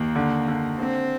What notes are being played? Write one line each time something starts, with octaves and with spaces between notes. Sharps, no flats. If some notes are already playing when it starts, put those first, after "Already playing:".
Already playing: D#2 A#3
D3
D3
D3 C4